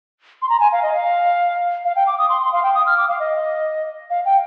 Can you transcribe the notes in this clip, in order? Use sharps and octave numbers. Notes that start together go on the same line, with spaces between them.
C6
A#5
G#5
F5
D#5
F5
F5
G5
D6
D#6
C6
C6
F5
G5
D#6
F6
D6
F5
D#5
F5
G5